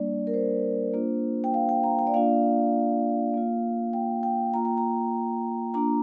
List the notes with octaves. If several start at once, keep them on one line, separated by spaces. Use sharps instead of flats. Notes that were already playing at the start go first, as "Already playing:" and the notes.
Already playing: G3 A#3 D4 D5
A#4
C5
A#3 D4 F4
G5
F5
G5
A#5
G5
D5
A#3 D4 F4 F5
A#3 F4
G5
G5
A#3 F4 A#5
G5
A#5
A#3 D4 F4 A#5